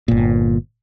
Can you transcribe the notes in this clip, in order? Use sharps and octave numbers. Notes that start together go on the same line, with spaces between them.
G1 A#2